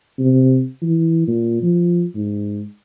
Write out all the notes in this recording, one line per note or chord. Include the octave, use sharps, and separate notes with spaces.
C3
E3
A#2
F3
G#2